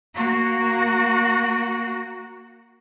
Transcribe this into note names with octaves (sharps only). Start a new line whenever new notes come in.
A#3 F#4